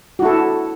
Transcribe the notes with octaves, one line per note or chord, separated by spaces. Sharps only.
E4 F#4 A4